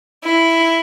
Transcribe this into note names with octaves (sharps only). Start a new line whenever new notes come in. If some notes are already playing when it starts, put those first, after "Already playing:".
E4